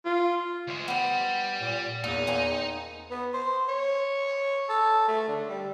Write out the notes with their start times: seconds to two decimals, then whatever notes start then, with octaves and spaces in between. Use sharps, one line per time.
0.05 F4
0.68 D2 G#3
0.88 G3 B3 C4
1.61 A#2
2.04 E2 A#2 D#4
2.27 A#3 C4 G#4
3.10 B3
3.33 C5
3.68 C#5
4.69 A4
5.08 A3
5.28 D3
5.49 G3